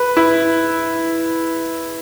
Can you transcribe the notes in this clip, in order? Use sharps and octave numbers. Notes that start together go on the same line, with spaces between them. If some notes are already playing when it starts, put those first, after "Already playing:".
Already playing: B4
E4